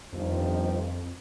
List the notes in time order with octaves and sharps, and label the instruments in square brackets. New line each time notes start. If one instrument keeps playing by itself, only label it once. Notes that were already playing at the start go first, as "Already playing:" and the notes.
[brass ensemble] G1 D#3 F3 [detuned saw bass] F2